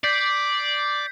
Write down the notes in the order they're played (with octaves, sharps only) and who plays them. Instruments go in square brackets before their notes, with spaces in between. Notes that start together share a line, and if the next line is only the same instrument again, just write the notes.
[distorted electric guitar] D5 [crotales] G6 B6 C7